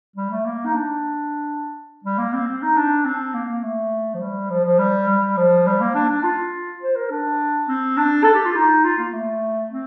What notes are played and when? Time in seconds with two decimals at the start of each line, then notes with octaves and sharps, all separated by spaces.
0.16 G3
0.31 A3
0.45 A#3
0.66 D#4
0.74 D4
2.04 G3
2.18 A#3
2.33 C4
2.47 C4
2.62 D#4
2.76 D4
3.06 C4
3.34 A#3
3.49 A#3
3.64 A3
4.14 F3
4.21 G3
4.50 F3
4.64 F3
4.79 G3
5.08 G3
5.37 F3
5.67 G3
5.81 A#3
5.95 D4
6.09 D4
6.23 F4
6.82 C5
6.96 A#4
7.10 D4
7.68 C4
7.97 D4
8.24 A4
8.35 G4
8.45 F4
8.56 D#4
8.84 F4
8.98 A#3
9.13 A3
9.71 C4